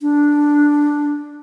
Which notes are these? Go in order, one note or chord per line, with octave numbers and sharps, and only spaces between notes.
D4